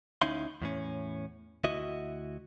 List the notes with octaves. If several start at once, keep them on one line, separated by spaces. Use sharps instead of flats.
D2 C#4 D#4 E4 F5 C6
E2 A2 C#4
D2 E4 F#4 D#5 E5